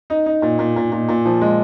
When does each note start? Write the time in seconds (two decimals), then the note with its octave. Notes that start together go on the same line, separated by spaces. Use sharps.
0.10 D#4
0.26 D#4
0.42 A#2
0.59 A#2
0.76 A#2
0.92 A#2
1.09 A#2
1.25 F3
1.41 G#3